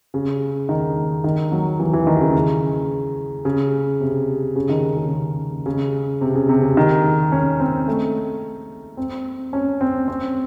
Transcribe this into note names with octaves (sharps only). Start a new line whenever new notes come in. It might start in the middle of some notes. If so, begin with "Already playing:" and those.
C#3
D#3
D#3
F#3
E3
E3
D#3
C#3
C#3
C3
C#3
D#3
C#3
C#3
C3
C#3
C3
C#3
D#3
C#4
C4
A3
C4
C#4
C4
C4